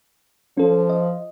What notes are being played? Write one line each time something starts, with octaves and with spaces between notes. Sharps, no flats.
F3 C#4 A4
D#5